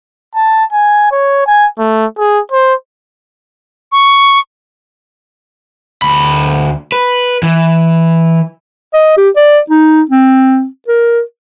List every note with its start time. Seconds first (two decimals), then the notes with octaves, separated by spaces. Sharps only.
0.35 A5
0.73 G#5
1.11 C#5
1.46 G#5
1.79 A3
2.18 G#4
2.52 C5
3.92 C#6
6.02 D2 B5
6.92 B4
7.43 E3
8.94 D#5
9.17 G4
9.36 D5
9.70 D#4
10.10 C4
10.88 A#4